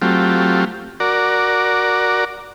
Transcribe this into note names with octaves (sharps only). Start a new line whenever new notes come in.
F#3 A3 C4 F4 G4
F#4 A#4 D5